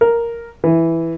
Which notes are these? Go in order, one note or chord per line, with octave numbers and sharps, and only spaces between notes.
A#4
E3